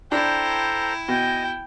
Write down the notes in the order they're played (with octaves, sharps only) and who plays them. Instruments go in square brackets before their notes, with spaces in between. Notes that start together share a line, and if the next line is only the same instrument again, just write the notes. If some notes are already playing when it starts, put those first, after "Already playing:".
[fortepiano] D4 [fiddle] E4 [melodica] A4 C5 A#5 [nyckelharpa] G5
[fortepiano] B2 [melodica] D#5 G#5 [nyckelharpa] G5